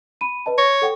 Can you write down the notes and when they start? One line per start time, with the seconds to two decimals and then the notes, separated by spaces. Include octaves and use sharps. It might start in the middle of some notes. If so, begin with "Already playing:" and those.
0.21 B5 D#7
0.46 B4 D#5 A5
0.58 C#5 A#6
0.82 A4 F#5 G5